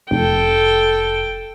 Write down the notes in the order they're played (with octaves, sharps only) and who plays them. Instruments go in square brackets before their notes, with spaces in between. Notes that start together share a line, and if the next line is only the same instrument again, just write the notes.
[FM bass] F1 [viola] A4 G5